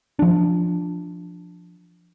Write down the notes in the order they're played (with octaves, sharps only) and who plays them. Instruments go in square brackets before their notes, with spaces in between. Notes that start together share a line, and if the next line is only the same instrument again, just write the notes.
[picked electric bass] F3 D4